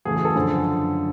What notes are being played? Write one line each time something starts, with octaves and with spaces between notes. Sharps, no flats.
E2 C#3 F#3 A3 G#4
G#4
A4
F#2 D3 F3